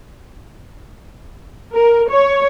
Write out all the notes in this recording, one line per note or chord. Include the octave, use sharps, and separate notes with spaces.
A#4
C#5